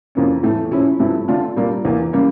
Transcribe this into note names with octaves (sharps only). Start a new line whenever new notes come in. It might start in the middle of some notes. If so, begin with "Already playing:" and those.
F2 E3 A#3 C#4
A2 E3 A3
A#2 F3 C#4 E4
G2 F3 A3 E4
D3 A3 D4 F4
A#2 G3 A#3 D4
E2 E3 A#3
C#3 G3 A#3